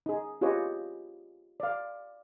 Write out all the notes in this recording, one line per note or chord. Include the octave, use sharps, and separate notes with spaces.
D#4 G#4
F4 G4 G#4 B4 C#5 D#5
D5 F5